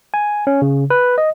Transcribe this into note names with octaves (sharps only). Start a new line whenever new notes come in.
G#5
C#4
C#3
B4
D#5